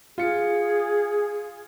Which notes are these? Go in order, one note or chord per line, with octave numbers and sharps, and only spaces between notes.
F4 G#4 C#7